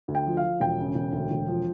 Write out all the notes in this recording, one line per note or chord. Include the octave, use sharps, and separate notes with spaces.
D2
G5
F3
F5
F3
E1 G5
C#3
E1
D2
E1
F3